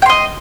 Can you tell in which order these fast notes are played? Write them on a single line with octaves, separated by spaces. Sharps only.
G5 C6 D#5